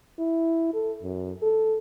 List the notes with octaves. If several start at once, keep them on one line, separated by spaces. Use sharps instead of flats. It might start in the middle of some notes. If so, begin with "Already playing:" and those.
E4
A4
F#2
A4